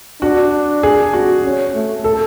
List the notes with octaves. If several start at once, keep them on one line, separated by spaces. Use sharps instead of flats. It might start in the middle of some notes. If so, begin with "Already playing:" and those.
D4 F#4
G#4
F#4
C#4
A3
A4